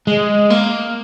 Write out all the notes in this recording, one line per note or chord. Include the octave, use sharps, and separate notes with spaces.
G#3
A#3